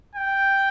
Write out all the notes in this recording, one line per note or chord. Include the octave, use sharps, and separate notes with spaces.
G5